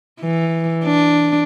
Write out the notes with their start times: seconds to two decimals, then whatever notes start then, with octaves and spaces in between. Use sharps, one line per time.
0.21 E3
0.85 D4